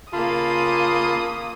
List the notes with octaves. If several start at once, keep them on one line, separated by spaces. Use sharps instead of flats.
C#3 A#3 F4 A5 B5 D#6